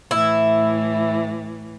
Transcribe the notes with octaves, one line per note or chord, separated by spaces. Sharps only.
A2 E3 E4